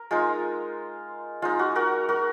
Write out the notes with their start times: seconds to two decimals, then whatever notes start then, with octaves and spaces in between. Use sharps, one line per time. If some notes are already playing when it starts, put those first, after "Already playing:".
Already playing: A#4
0.11 G#3 D#4 F4
1.42 G#3 D#4 F4
1.59 F#4
1.75 F#4 A#4
2.09 F#4 A#4